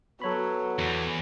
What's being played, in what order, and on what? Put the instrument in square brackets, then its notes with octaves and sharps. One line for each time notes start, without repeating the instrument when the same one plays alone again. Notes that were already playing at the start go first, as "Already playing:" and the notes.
[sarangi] F#3 [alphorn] B3 [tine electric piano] A4 C#5 B5
[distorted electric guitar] E2